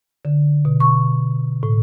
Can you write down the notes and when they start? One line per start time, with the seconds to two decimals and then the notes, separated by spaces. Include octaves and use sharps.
0.25 D3
0.65 B2
0.80 C#6
1.63 A2